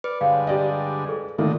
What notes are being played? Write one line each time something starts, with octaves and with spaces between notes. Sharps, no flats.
B4 D5
G2 D3 G#3 C#5 F5
G4 D5 D#5
G#4 A4
A2 D3 D#3 A#3 D#4 F4 A4